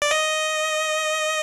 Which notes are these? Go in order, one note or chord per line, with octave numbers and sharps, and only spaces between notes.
D5
D#5